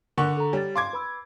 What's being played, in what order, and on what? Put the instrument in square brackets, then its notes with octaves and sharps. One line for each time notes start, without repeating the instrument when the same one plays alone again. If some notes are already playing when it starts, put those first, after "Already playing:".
[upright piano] D3 F#5 C#6 [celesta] A#4
[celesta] A4 A#5
[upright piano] G3 [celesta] C#5 A6
[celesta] F5 [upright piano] C6 D6 G#6
[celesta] B4 B5 E6